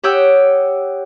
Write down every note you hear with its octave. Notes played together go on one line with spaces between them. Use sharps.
G4 C#5 F#5 G5 D#6 E6